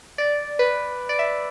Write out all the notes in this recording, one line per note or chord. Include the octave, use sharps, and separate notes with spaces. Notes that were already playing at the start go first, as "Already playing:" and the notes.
D5
B4
D5
E5